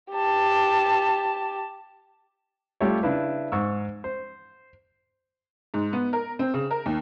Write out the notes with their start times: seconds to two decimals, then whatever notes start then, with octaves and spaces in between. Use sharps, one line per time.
0.12 G4 A5
2.81 G3 A3 F4 G4 C#5
3.03 C#3 D4 E4 B4
3.52 G#2 C#6 E6
4.04 C5
5.74 G#2
5.93 B3
6.13 A#4
6.39 C4
6.54 C#3
6.71 A#4
6.86 D#2